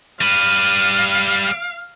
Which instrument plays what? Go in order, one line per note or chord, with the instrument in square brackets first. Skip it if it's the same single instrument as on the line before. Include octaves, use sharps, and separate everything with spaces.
[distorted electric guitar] G3 B4 [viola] F5